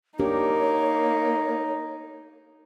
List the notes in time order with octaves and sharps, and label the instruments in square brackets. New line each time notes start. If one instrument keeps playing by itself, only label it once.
[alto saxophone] A#3 [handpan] D4 G4 A#4 [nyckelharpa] D#4 [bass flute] C#5